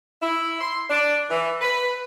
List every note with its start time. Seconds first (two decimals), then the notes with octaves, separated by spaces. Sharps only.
0.22 E4
0.61 C6
0.89 D4
1.30 E3
1.61 B4